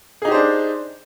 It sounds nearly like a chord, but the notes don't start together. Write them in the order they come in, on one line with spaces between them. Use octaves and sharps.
G#4 D#4 G4 C5 D4